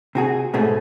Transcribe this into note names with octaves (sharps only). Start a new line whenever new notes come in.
C3 F#4 G#4
G#2 B2 A3 C#4 G#4